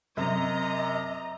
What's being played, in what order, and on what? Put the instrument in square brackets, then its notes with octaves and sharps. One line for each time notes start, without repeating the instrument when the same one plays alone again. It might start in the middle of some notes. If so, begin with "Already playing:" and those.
[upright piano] F#2 C3 [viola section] D#5 A#5